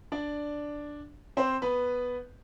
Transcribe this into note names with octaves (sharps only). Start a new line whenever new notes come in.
D4 D5
C4 C5
B3 B4